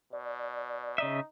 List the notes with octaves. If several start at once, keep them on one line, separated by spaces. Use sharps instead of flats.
B2 D5
C#3 D#4 D#5 E5